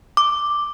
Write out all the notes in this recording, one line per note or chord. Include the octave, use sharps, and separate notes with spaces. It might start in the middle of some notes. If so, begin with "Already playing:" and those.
D6